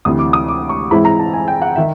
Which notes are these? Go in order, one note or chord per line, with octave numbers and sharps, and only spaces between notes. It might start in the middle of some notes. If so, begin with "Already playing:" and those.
D2 C3 E3 D#6
D6
D#6
D6
C#6
G#2 E3 G#3 C4 E4 B5
A#5
A5
G#5
G5
F#5
D#3 E5